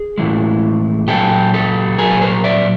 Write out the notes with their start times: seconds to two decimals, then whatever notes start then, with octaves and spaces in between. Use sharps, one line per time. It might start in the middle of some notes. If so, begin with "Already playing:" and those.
Already playing: G#4
0.18 A2 E3 G#3
1.07 A#2 F#3 G4 A4
1.54 G4 A4
1.98 A#2 F#3 G#4 A#4
2.11 B4
2.21 A#4 C5
2.44 D5 E5